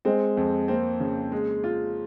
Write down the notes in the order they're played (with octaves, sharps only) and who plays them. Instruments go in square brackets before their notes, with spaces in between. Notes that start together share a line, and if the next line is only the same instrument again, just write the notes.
[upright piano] G#3 [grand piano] C4
[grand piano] F2
[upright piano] A#3 [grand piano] C4
[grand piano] C#3
G#3
F4